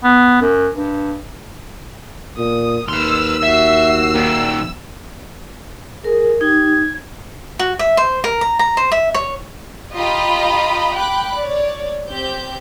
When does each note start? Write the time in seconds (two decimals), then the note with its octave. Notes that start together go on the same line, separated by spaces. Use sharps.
0.04 B3
0.42 F#2
0.74 G2
2.38 A#2 D#6
2.89 D#2 B4 C6 E6 F6
3.43 F#4 E5 C7
4.15 A#2 D#3
6.04 G#4 A#4
6.41 D#4 G4 G#6
7.59 F#4
7.79 E5
7.97 C5
8.24 A#4
8.41 A#5
8.59 A#5
8.77 C5
8.92 E5
9.14 C#5
9.95 F4 G4 D#5 F5 A#5 B5
10.95 G5 B5 D6 F#6
11.37 C#5 D5
12.09 C4 G4 G6